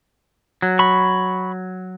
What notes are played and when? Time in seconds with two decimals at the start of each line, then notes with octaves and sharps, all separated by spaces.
0.62 F#3
0.79 B5 C#6